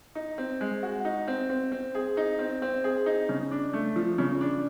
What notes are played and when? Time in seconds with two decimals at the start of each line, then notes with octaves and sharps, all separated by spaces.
0.15 D#4
0.38 C4
0.61 G#3
0.83 F#4
1.05 D#4
1.28 C4
1.50 C4
1.72 C4
1.95 G#4
2.17 D#4
2.39 C4
2.62 C4
2.84 G#4
3.06 D#4
3.29 C#3
3.51 D4
3.73 A3
3.96 F3
4.18 C#3
4.41 D4